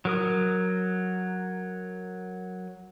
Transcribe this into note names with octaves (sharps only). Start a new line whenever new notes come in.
F#3 A#4 D#6